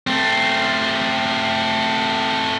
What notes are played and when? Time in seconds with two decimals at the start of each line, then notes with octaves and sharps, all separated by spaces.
0.07 A3 C4